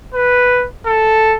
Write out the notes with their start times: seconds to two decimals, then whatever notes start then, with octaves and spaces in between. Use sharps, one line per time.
0.14 B4
0.86 A4